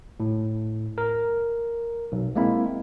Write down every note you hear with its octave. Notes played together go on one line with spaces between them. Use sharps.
A2
A#4
B1
G#3 A#3 C4 E4